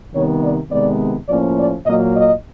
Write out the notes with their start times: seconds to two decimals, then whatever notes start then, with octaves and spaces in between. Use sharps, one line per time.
0.13 C3 D#3 G3 B3 C#5
0.42 D5
0.70 C3 D#3 G#3 B3 D5
1.28 A2 F3 A#3 C#4 D5
1.57 D5
1.86 A#2 F#3 A#3 D#5
2.15 D#5